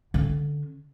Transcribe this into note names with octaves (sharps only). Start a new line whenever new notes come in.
D3 C#4